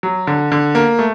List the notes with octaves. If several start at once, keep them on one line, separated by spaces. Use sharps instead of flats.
F#3
D3
D3
A#3
A3